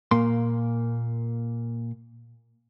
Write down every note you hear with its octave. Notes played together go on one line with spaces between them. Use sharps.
A#2 A#3 C6